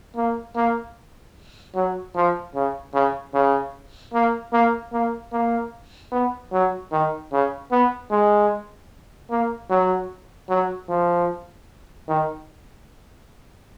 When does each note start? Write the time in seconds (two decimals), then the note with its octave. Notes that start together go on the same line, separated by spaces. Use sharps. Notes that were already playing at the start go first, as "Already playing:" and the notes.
0.16 A#3
0.56 A#3
1.76 F#3
2.15 F3
2.55 C#3
2.95 C#3
3.34 C#3
4.14 A#3
4.53 A#3
4.93 A#3
5.32 A#3
6.12 B3
6.52 F#3
6.92 D#3
7.32 C#3
7.72 B3
8.11 G#3
9.31 A#3
9.70 F#3
10.49 F#3
10.89 F3
12.08 D#3